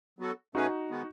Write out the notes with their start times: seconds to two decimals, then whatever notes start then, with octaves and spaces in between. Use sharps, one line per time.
0.19 F#3 B3 F#4 A4
0.55 B2 A3 C#4 D#4 F#4 G#4 B4
0.90 D#3 G#3 B3